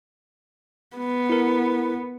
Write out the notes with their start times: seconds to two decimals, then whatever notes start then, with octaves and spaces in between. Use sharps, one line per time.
0.97 B3
1.30 E4 A#4